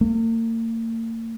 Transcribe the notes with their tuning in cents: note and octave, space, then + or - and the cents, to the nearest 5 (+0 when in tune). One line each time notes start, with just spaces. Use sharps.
A#3 -40